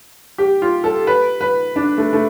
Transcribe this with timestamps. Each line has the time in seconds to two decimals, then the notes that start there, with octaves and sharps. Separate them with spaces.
0.38 G4
0.62 F4
0.84 A4
1.07 B4
1.41 B4
1.76 D4
1.98 A3
2.13 A3